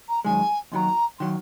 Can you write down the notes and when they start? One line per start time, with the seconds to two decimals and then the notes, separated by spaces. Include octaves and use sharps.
0.09 A#5
0.25 F#2 D#3 G#3 G#5
0.72 D#2 D#3 F#3 A#5 C6
1.19 D#3 F#3 C6